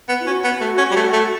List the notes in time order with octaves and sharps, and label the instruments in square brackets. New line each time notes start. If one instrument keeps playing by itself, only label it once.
[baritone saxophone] B3
[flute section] E4
[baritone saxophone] C#4 [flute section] F#4
[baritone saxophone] B3
A3
C#4
G3
A3
A3